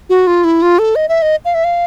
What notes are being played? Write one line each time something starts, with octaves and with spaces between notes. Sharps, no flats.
F#4
F4
E4
F4
A4
D#5
E5
D#5
F5
E5
F5